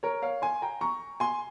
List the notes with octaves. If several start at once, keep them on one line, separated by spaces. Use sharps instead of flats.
A#4 C#5
C#5 F5
G#5 C6
G5 A#5
A#5 C#6
G#5 C6